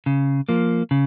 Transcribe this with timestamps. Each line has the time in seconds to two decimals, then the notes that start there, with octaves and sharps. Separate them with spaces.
0.06 C#3
0.49 F3 A#3
0.91 C#3